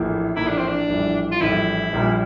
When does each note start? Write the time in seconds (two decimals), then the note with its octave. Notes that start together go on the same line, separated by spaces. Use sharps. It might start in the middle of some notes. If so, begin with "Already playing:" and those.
Already playing: A#1 A2 E3 A#3
0.36 A#1 A2 E3 A#3 E4
0.47 D4
0.58 C4
0.68 D4
0.89 A#1 A2 E3 G3
1.32 F4
1.41 A#1 A2 E3 G3 E4
1.93 A#1 A#2 G3 A#3